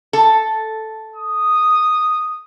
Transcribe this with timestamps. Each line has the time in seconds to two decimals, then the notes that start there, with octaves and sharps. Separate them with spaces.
0.13 A4
1.16 D#6